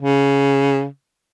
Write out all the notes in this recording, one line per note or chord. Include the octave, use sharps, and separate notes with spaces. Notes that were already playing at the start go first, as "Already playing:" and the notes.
C#3